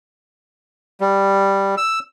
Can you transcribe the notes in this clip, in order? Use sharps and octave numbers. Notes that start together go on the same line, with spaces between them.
G3
E6